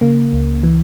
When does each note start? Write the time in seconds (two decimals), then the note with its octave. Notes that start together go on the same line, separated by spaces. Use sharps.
0.01 C#3 A#3
0.33 C#2
0.63 E3